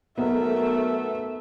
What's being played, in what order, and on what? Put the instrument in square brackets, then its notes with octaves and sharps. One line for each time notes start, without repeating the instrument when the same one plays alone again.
[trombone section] B1 A#4 [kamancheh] A3 E5 [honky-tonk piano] B3